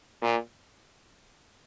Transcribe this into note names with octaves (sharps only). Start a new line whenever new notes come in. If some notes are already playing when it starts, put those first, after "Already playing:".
A#2